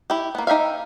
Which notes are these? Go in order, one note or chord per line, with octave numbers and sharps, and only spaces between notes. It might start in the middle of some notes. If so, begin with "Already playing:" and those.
E4 G4
A#3 B3
D#4 G4 E5 F5